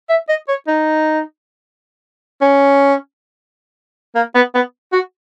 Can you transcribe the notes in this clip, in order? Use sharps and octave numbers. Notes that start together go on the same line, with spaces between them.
E5
D#5
C#5
D#4
C#4
A#3
B3
B3
F#4